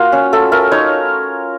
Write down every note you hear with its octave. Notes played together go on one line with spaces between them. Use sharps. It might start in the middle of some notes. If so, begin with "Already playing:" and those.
Already playing: A#3 F4 F#4
C#4
A3 A4
A3 A#4
D#4 C#5